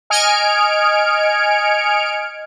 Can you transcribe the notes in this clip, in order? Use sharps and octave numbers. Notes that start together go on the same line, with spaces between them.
D#5 G#5 F6 G#6 C#7 D7